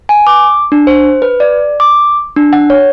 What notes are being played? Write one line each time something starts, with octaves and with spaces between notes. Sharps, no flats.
G#5
D6
D4
C5
B4
D5
D6
D4
F#5
C#5